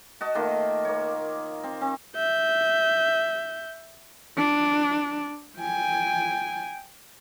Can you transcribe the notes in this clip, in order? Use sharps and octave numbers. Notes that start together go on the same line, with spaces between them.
F#4 D#5 A5
D#3 A3 A#3 F4
A#3 C#5
C4
C4
E5 G6
D4
G5 G#5